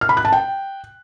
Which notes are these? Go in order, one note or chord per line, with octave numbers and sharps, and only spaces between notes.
F6
B5
F#6
A5
G5